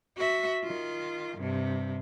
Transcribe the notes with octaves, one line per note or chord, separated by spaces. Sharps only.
F#4 E5
D#3 F4
G2 C3